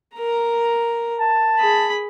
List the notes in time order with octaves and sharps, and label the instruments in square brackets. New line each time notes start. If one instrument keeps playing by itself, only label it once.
[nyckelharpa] A#4 A#5
[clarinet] A5
[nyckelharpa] G#4 B5